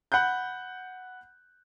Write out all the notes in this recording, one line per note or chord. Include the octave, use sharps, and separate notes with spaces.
F#5 B5 F#6 G6